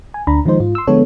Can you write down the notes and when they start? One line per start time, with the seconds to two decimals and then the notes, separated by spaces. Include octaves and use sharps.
0.14 G#5
0.27 D2 D4 A#5 B5
0.45 D#3 F3 G#3 D#4 C5
0.60 G#2 F4
0.75 C6 E6
0.87 D3 F3 G#3 B3 A4 C#5